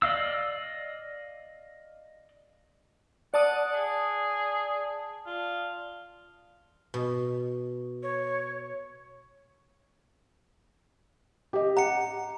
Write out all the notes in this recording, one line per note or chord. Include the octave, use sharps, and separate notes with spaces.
D5 D#5 F5 E6
D5 F#5 A5 D#6
G#4
F4
B2
C#5
G4 D#5
F#5 A#5 C#7